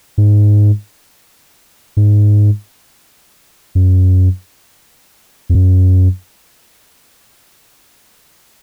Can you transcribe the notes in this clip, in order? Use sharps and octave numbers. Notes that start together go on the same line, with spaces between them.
G#2
G#2
F#2
F2
F#2